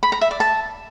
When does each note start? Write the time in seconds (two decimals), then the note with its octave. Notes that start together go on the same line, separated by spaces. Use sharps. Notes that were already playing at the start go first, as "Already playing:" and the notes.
0.03 B5
0.12 A#5
0.21 E5
0.31 D5
0.40 A5